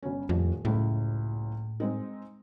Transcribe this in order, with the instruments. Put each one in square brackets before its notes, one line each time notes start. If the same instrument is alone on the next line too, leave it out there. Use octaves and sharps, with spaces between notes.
[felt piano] G1 C#4
[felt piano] D#1 A2 F3 [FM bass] F2
[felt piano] F#1 C#2 E4 [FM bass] A2
[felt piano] G#3 C4 D#4